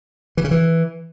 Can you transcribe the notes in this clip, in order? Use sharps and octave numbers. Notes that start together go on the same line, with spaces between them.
E3
C#3
E3